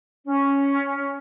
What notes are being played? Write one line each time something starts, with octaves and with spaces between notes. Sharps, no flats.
C#4